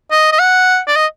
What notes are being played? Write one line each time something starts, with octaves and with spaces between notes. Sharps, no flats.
D#5
D#5
F#5
D5
D#5